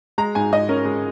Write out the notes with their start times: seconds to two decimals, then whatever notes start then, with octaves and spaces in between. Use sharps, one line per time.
0.18 G#3 A#5
0.35 G#2 G#5
0.52 G#2 D#5
0.69 C#4 A#4
0.85 G#3